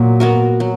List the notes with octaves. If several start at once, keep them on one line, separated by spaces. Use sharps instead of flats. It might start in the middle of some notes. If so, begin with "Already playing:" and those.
Already playing: A#2 F#3
B3 F#4 A#4
F#3